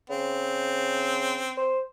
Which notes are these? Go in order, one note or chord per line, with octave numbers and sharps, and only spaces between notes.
C#3 C4
C5